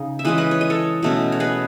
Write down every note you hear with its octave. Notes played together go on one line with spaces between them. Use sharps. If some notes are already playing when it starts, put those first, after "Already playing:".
Already playing: C#3 D#4
E5
E3 G#3 C#4 B4 D#5
B4 D#5
C#5
D#5
A4 C#5
B2 A3 C#4
C#5
G#4 B4